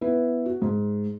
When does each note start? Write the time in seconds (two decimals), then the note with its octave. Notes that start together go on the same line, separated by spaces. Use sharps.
0.01 B3 E4 B4
0.46 F#4
0.62 G#2